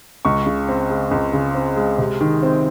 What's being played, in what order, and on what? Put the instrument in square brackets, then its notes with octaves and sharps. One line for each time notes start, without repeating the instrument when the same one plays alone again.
[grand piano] C#2 C#6
C#3
C4
G#3
C#2
C#3
C4
G#3
C3
D#3
C4